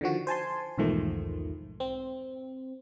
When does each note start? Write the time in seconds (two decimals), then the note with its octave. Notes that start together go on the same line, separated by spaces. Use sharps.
0.01 D3 D#3 F3 F#4
0.27 C5 G#5 A5 C6
0.78 B1 E2 G#2 D#3 F3 A3
1.80 C4